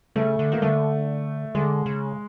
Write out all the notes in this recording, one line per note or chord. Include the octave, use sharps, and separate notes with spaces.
C#3 A3
D3
D#3 A#3
D3 A3
D3 G#3
C#3